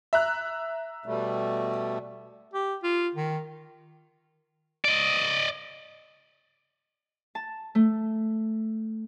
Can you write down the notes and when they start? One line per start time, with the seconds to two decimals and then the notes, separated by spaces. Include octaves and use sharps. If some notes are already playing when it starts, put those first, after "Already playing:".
0.13 E5 A#5 F#6
1.06 B2 G3 A3
2.53 G4
2.83 F4
3.15 D#3
4.85 D5 D#5
7.35 A5
7.75 A3